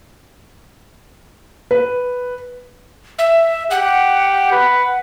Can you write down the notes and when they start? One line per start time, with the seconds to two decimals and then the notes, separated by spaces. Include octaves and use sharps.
1.71 B4
3.19 E5
3.71 G4 F#5
4.52 B4